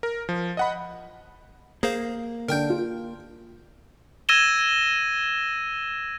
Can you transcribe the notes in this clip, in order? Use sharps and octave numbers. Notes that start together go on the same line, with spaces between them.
A#4
F3
D#5 F#5 B5
A#3 G#4 C5 F5
D3 D4 A#4 G5 G6
F4
E6 G#6 A#6 D#7 E7 G7